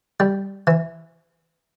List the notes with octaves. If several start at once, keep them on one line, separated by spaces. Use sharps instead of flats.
G3
E3